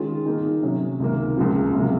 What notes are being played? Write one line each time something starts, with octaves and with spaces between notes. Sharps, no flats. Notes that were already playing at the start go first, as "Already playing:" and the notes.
Already playing: D#3 G#3 C#4 F4 G#4
D#3 A#3 D#4 G#4
C3 F#3 C#4
C#2 C3 D#3 A#3
C#2 C#3 F3 A#3
C#2 C3 F#3 A#3